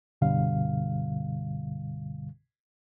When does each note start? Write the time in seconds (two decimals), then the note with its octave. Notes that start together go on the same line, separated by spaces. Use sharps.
0.21 C2 G2 B2 D3 G3 F5